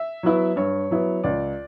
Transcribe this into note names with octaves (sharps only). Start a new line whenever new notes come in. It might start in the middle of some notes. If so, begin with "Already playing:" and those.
Already playing: E5
F#3 B3 E4
G2 C#5
F#3 B3 E4
C#2 D5